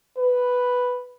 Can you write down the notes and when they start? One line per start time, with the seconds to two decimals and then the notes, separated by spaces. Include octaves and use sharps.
0.18 B4